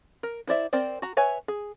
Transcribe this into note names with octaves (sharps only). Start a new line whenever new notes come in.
A#4
E4 C5 D5 E5
C4 A#4 C5 D5
F#4 A#5
B4 C#5 E5 G#5
G#4